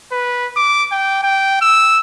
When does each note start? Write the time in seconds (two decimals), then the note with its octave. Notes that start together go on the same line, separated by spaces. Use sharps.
0.12 B4
0.56 D6
0.92 G5
1.23 G5
1.61 E6